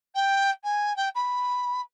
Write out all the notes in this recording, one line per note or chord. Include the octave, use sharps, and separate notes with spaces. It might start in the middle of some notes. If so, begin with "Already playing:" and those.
G5
G#5
G5
B5